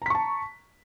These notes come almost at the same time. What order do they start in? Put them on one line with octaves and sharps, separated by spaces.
A#5 B6 C#6 A5